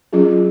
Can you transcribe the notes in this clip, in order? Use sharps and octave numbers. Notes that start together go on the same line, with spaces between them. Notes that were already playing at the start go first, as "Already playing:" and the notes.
F#3 C#4 F4 G#4